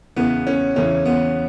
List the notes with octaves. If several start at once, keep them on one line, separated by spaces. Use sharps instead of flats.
E2 C#3 E3 B3
C#4
E2 C#3 E3 C#4
B3